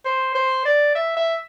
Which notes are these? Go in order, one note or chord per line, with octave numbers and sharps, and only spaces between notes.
C5
C5
D5
E5
E5